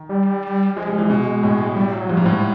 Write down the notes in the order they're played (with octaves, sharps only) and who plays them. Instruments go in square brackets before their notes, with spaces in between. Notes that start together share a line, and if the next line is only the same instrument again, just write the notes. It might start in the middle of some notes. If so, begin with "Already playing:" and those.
Already playing: [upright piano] D#3
[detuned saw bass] G3
[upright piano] F3 [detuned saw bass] G#3
[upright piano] G3
[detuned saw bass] G#3
[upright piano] E3
B2
A2
[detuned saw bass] G3
F#3
[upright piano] G2 [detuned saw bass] F3
[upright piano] G#2
[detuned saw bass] F3
[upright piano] A2
[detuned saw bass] F3